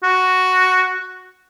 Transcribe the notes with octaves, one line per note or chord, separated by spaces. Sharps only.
F#4